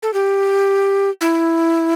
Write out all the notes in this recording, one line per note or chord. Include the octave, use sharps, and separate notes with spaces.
A4
G4
E4